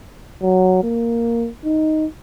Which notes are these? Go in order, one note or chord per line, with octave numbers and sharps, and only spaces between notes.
F#3
A#3
D#4